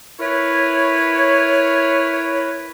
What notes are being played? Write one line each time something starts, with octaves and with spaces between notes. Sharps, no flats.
E4 A#4 B4 C#5